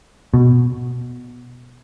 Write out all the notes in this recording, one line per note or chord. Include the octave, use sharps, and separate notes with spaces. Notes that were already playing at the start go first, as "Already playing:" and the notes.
B2